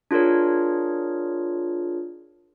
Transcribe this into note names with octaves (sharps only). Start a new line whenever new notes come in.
D4 F4 G#4 A#4 C#5